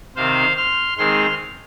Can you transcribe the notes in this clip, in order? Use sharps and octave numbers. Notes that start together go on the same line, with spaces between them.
C3 D#3 C4 C5 F5
C6 F6
D#3 G#3 C4 C6 F6